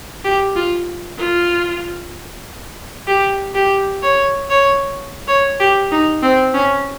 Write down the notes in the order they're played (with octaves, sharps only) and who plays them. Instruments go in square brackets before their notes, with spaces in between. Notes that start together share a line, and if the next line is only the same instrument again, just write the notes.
[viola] G4
F4
F4
G4
G4
C#5
C#5
C#5
G4
D#4
C4
C#4